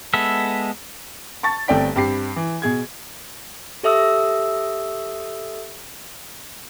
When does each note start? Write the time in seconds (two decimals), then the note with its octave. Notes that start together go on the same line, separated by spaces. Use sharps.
0.14 G#3 B3 A4 E5
1.43 A5 C#6 A6
1.68 G1 A3 C4 D5 G5 B6
1.96 G2 C4 G4 B5 C7
2.36 E3
2.62 B2 G#4 G#6
3.83 G4 A4 E5 D#6 E6